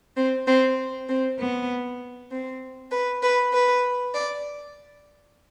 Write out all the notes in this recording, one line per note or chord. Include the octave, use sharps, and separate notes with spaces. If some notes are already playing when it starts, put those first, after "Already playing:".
C4
C4
C4
B3
C4
B4
B4
B4
D5